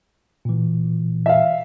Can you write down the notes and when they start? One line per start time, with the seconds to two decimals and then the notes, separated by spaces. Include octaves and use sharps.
0.45 A#2 E3
1.26 E5 F5